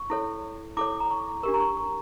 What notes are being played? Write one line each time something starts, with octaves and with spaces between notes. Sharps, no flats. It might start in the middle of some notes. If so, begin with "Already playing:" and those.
Already playing: C#6
E4 A4 C#5
E4 A4 C#5 D6
A#5
C#6
D4 G4 A#4 C#6
A#5
C#6
C#6